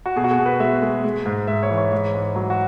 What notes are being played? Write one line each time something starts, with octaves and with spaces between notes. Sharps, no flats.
F#4
B2 G#4
F#4
G#4
B2
B4
G#3 E5
G#3
G#3
G#2
G#2 E5
C#5
E3
C#5
G#2
G#2
F#3
F#4